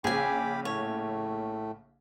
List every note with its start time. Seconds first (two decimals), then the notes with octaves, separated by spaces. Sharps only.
0.04 A#1 C#3 G#4 G5 G#5 B5 D6
0.65 A2 A3 C#5